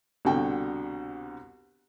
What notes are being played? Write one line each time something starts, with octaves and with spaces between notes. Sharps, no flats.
C2 B2 D3 F#4 G5